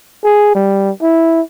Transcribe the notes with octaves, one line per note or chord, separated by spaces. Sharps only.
G#4
G3
E4